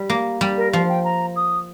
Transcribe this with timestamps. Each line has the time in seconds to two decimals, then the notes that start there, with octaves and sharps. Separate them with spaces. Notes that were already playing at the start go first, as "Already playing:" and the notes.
Already playing: G3
0.10 A#3
0.41 G3
0.57 A#4
0.72 F3 F5
0.89 G5
1.04 A#5
1.36 D#6